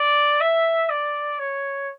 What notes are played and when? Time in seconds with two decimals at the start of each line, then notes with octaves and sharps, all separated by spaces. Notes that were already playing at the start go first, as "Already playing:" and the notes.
Already playing: D5
0.41 E5
0.90 D5
1.39 C#5